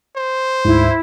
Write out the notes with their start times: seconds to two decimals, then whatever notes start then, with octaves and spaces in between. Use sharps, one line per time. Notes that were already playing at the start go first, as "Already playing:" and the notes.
0.16 C5
0.65 D2 G#2 E4